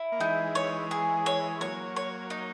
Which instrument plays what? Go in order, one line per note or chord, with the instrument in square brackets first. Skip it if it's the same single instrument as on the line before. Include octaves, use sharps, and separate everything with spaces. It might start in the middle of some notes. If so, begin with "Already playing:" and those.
Already playing: [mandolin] E4
[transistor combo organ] A#3
[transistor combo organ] E3 G#3 [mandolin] D#4
[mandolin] C#5
G#4
C#5
[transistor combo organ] F#3 A#3 [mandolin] C#5
[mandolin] C#5
D#4